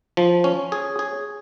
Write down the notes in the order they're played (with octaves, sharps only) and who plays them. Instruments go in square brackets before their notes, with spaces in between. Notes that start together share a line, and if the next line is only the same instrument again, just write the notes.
[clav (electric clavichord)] F3
C#4
G#4
G#4